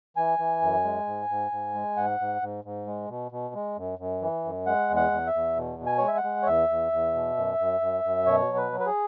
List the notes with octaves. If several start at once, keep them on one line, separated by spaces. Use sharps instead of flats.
E3 G#5
E3
F#2
G#3
G#2
G#2
G#2
G#3
G#2 F#5
G#2
G#2
G#2
G#3
B2
B2
G#3
F#2
F#2
E3
F#2
G#3 F#5
E2
F#5
E2
E5
E2
B2
B2
G#5
G#3 C#5
E5
F#5
G#3
C#5
E2 E5
E2
E2
B2
F#2
F#2
F#2
F#2
B2 C#5
F#3
B4
F#3
B4
G#4